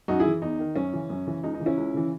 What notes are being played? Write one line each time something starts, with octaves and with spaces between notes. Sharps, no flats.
F#2 D#4 F#4
E4 G#4
E3
E2 D#4
D#3
F#2 C#4
C#3 E3
F#2
C#3 E3
C#2 D#4
D#4
C#3 E3
C#4 E4
C#2
C#3 E3